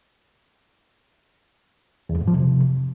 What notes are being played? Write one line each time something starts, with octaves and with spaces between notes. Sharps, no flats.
E2
F2
G#2
F3
C3